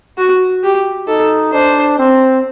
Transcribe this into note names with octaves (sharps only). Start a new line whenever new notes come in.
F#4
G4
D#4 A4
D4 C5
C4